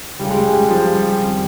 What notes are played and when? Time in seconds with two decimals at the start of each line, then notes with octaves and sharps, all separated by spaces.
0.19 C#2 C#3 G3
0.31 G#3
0.37 G3
0.53 G#3
0.70 F3
0.87 G3
1.21 F2 D#3 G3